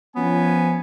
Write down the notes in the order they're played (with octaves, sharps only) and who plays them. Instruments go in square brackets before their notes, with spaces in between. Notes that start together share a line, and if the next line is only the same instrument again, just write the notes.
[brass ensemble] F3 C#4 G#5 [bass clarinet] B3